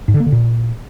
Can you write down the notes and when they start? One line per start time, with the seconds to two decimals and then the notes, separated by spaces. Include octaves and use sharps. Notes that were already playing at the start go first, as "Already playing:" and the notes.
0.08 G#2
0.14 D3
0.20 A#3
0.26 D3
0.32 A#2